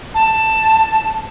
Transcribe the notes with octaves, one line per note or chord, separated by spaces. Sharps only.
A5